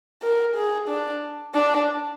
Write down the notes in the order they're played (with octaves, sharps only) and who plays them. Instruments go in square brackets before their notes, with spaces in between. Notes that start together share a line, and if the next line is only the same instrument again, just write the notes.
[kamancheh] A#4
G#4
D4
D4